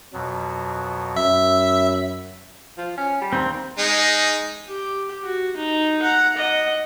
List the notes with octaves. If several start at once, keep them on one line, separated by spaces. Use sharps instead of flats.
F2 B2 F#3
F#2 E5 B5
F3
C#4
G3
D#2 C4 A#5 C6
G#3 D#4
G4
F#4
D#4
F#5 A#5
D#5 F#5